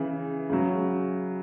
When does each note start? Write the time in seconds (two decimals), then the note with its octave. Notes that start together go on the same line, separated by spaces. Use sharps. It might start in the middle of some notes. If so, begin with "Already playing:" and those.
Already playing: C#3 E3
0.49 C#3 F#3